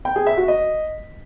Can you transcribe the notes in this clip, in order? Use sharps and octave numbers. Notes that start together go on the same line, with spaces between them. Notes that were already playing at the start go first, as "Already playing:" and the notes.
G5
G#4
E5
F#4
D#5